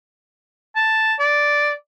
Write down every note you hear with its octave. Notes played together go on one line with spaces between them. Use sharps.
A5
D5